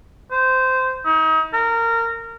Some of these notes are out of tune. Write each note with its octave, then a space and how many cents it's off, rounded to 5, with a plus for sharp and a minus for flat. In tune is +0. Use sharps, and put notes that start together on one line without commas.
C5 -15
D#4 +35
A#4 -20